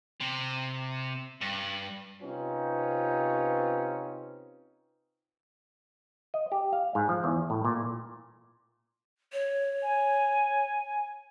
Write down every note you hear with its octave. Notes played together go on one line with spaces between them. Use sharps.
C3
G2
C3 C4 C#4 D#4 F4 B4
D#5
G4
F5
G#2
F3
E2
A2
A#2
C#5
G#5